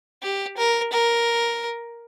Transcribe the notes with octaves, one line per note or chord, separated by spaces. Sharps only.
G4
A#4
A#4